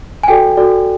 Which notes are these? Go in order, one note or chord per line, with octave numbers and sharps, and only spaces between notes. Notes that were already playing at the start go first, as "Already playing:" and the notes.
G#5
F#4 A4 D5 G5
F#4 A4 D5